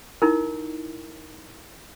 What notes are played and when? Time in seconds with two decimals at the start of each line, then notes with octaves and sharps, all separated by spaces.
0.22 D#4 E4 A#4